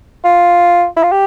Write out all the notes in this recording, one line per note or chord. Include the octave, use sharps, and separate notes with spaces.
F4
E4
F4
G4